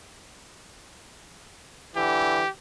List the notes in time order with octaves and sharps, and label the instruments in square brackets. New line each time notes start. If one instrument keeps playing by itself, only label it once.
[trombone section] D3 E3 [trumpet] G4